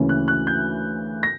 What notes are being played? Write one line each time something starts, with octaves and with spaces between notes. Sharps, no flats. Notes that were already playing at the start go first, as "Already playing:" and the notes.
Already playing: D2 C#3 E3 A#3 C#4
F#6
F#6
G6
A#6